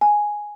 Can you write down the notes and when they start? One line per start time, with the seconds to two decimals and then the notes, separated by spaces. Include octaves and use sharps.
0.01 G#5